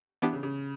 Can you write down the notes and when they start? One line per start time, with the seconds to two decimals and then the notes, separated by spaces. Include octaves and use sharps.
0.22 E3 B3 D4 G4
0.33 C#3
0.43 C#3